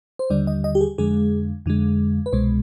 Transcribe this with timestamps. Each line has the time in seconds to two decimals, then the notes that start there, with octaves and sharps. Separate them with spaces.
0.19 C5
0.30 D#2 D3 G3 D5
0.47 D#5
0.64 D#5
0.75 G4
0.81 G#4
0.98 F2 D3 G#3 G#4
1.66 F2 D3 G#3
2.26 B4
2.33 C2 B2 G#3 C5